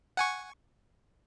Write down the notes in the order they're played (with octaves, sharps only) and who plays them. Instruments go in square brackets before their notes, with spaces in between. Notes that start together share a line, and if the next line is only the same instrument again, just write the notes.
[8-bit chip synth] F#5 G#5 C#6